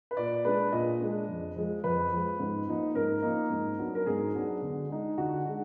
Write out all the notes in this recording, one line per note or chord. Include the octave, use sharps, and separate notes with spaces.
B4
A#2 D5
G#3 D4 B4
A#2 D#5
G#3 D4
F2
F3 G#3
F2 B4
F3 G#3
G#2
F3 A#3 D#4
G#2 A#4
F3 A#3 D#4
G#2
F#3 B3 D4
A#4
G#2 G#4
F#3 B3 D4
D3
G#3 D#4
D3 F#4
G#3 D#4